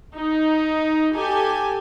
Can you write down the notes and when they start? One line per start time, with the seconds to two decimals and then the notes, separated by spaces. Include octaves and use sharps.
0.15 D#4
1.15 G4 A4 G#5